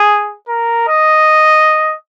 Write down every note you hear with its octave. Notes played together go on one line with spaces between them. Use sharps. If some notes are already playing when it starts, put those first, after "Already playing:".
Already playing: G#4
A#4
D#5